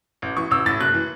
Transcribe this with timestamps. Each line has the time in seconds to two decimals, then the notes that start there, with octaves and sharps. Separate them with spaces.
0.22 A1
0.37 E3 C#6
0.51 A1 E6
0.66 A2 A6
0.81 F#1 F#6
0.94 E3